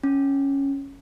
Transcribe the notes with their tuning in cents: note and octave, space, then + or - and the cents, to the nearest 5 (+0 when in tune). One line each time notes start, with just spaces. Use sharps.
C#4 -5